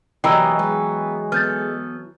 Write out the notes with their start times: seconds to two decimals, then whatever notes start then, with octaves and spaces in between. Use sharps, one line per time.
0.24 C3 E3 F#3 A#3 D#5 G5 A#5 E6
0.59 G#3 B3
1.32 B3 A4 F6 G6 A6